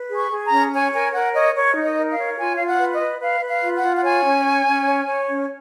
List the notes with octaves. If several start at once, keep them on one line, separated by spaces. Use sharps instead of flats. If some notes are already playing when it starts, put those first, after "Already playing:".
Already playing: B4
G#4
C#6
G#4
A#5
C#4
C#5 G#5
A#4 G#5
A#4 F#5
C#5 D#5
A#4 C#5
D#4
D#5
A#4
F5
C#5
F4 G#5
F4 F5
F#5
B4
D#5
B4
B4 F5
B4
F5
F4
F#5
F4
F#5
C#5 G#5
C#4
C#5
C#4
C#5
C#5
C#4